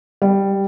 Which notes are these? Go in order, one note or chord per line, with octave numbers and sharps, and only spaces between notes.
G3